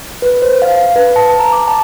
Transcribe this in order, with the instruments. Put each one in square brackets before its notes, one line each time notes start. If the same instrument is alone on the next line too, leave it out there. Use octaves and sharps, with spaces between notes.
[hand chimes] B4
C5
F5
B4
A5
A#5
D6
A5